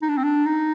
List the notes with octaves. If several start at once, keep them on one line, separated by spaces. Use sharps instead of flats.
D#4
D4
C4
D4
D#4